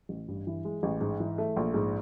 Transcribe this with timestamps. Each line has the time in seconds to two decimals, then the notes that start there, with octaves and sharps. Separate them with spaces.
0.09 A1
0.28 G2
0.47 E3
0.65 G#3
0.83 A1
1.01 G#2
1.20 E3
1.38 A3
1.57 A#1
1.74 G#2